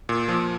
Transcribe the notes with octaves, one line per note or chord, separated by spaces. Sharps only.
A#2
F3